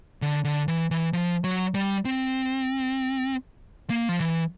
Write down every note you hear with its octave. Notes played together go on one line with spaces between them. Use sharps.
D3
D3
E3
E3
F3
F#3
G3
C4
A#3
F3
E3